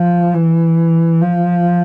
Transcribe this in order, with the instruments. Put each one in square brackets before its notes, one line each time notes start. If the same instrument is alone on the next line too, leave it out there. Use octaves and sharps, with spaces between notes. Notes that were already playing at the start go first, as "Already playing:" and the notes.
Already playing: [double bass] F3
E3
F3